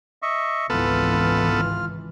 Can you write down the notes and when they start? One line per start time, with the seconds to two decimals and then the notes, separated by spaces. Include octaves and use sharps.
0.22 D#5 E5 C#6
0.70 G#1 C#2 E3 B3 F4 A4 F6